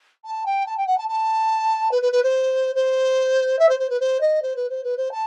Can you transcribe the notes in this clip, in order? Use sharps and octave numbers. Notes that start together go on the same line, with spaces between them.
A5
G5
A5
G5
F#5
A5
A5
B4
B4
B4
C5
C5
E5
C5
C5
B4
C5
D#5
C5
B4
C5
B4
C5
A5